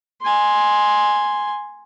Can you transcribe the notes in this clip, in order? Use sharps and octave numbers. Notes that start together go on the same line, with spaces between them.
G#5 C6